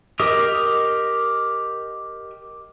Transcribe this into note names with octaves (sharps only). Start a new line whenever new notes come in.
G4 A#4 D#5 D#6